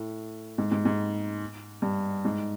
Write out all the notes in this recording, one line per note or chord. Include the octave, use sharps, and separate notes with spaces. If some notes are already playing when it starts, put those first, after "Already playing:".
Already playing: A2
G#2
G#2
G#2
G2
G#2